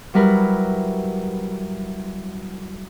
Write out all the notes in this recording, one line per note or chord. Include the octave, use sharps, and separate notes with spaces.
F#3 G3 E4 A#4 B4